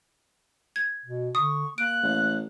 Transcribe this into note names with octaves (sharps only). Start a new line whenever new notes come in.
G#6
B2
D3 C#6 D#6
A#3 F#6 D7
A1